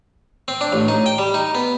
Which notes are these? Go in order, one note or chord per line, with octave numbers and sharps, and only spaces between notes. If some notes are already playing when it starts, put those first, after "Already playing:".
C4
D4
A1
D#4
G5
G3
D#4
B3